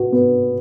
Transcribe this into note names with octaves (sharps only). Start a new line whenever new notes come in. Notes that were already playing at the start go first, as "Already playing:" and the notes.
Already playing: F#4 B4
B3